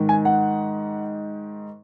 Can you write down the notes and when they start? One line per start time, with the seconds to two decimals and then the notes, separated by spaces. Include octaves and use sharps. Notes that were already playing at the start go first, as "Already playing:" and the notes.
Already playing: G#2 D#3
0.09 G#5
0.25 F#5